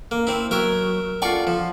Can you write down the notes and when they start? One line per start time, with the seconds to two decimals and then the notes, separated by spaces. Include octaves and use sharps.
0.11 A#3
0.27 C4 E4
0.51 F#3 A#4 E5
1.22 F4 A4 D5 F#5 C#6
1.47 F3